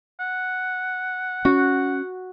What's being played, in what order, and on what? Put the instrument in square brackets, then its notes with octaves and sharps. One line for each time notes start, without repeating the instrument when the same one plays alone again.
[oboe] F#5
[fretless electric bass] C#4 [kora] F#4